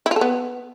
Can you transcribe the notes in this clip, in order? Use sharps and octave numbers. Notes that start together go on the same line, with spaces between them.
E4
F4
A4
B3